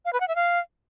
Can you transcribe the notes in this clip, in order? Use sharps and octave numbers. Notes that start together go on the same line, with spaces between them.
F5
B4
F#5
E5
F5